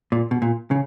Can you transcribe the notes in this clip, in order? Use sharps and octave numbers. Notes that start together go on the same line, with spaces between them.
A#2
B2
A#2
C#3